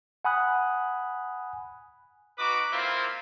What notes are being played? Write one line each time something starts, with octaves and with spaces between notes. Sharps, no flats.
F#5 G#5 B5 D#6 F#6
D#4 F#4 B4 D6
A#3 C4 E4 F4